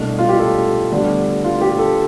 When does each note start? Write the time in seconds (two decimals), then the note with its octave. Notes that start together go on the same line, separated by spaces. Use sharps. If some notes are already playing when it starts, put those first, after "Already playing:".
Already playing: C2 B2 A3 D4
0.19 F4
0.29 G4
0.39 A4
0.92 D2 D3 G3 B3 D4
1.44 F4
1.61 G4
1.79 A4